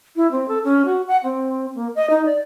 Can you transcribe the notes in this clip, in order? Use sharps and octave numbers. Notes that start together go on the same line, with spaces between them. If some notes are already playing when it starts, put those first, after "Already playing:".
E4
C4
A4
C#4
F#4
F#5
C4
A#3
D#5
D#4
D5